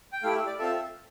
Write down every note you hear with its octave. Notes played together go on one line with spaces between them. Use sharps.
G5
A3 E4 G4 F5
E5
D5
C4 F4 A4 E5